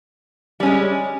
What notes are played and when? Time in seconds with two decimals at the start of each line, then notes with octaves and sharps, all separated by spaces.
0.60 G3
0.63 C#4
0.66 G#3